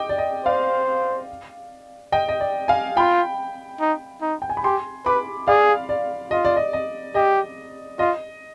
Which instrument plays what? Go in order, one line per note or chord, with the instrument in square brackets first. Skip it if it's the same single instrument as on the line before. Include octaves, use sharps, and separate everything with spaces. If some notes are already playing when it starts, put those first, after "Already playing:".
Already playing: [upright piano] D#5 G5 D6
D5
D#5
[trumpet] C5 [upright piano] D5 F5
[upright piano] D#5 G5
D#5
D5
F5 G#5
[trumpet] F4 [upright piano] G5 B5
[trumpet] D#4
D#4
[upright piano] G5
G#5
B5
[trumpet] G4 [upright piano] G#5 C6
[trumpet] B4 [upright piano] B5 D6
[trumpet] G#4 [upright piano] D5 F5
[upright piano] D5
[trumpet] F4 [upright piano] D#5
[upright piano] D5
D#5
D#5
[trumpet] G4 [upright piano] D#5
[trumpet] F4 [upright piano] D#5